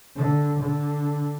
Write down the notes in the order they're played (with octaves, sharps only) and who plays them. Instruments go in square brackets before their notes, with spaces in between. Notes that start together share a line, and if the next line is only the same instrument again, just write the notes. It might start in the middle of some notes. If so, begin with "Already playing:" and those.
[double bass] D3
D3